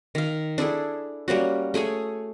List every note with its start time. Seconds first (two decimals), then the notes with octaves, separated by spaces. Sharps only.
0.15 D#3 F5
0.58 D4 E4 G#4 A4
1.28 G3 A#3 C#4 F#4
1.74 A3 G#4 C#5 G#5